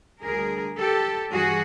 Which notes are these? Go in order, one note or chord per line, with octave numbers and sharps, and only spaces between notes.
D2 D3 G3 G#4 A#4
G4 A4
G2 E3 G3 F#4 G#4